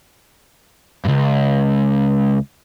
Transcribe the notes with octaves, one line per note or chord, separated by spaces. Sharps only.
C#2 G2